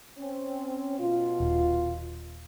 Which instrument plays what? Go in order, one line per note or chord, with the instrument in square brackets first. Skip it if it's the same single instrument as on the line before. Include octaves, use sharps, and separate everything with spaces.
[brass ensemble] C4 C#4
B2 F4
[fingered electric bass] D#1